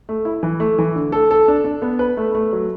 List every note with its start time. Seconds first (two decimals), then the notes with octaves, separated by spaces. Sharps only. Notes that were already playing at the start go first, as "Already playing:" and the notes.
0.09 A3
0.25 E4
0.43 E3
0.60 A3
0.78 E3
0.96 D3
1.12 A4
1.31 A4
1.48 D4
1.64 D4
1.82 B3
1.99 B4
2.17 A3
2.35 A3
2.53 F#3